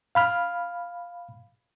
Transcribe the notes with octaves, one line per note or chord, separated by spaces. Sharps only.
F5 B5 F6